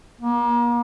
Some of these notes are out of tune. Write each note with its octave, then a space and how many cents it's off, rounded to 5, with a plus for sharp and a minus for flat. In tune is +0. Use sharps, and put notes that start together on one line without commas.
A#3 +35